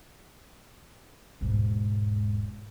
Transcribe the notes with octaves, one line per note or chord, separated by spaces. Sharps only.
E1 G#2